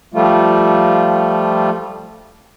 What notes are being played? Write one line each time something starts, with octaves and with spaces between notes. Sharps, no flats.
F3 G3 A3 F4